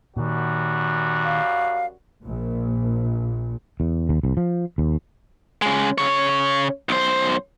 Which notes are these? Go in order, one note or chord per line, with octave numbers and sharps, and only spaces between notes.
F#2 A#2 D#3 G3 F#4
F5
A#1 A#2
E2
D#2
C2
F3
D#2
C#3 G#3
C#3 C#5
B1 C5